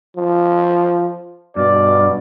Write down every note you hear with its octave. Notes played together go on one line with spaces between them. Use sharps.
F3
G2 B2 D5